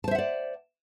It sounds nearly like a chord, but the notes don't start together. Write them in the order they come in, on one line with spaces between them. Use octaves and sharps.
A5 C5 E5 F#5 D5